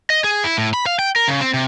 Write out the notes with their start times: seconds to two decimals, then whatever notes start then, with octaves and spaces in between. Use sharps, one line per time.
0.10 D#5
0.24 G#4
0.44 E4
0.58 A2
0.74 B5
0.86 F5
0.99 G5
1.16 A#4
1.28 C#3
1.41 C4
1.54 C3